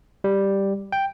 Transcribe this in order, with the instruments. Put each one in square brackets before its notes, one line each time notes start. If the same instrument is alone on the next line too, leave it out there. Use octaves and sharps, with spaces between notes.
[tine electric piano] G3
G5